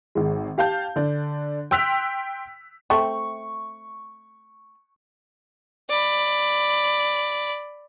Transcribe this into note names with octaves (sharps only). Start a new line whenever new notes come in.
G#1 G#3
G4 F5 A5 G6
D3 D4
G5 C6 E6 F#6 B6 F7
A3 C4 C#6
D5 B5